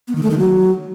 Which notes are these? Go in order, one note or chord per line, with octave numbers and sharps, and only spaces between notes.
B3
D#3
A3
D#3
F#3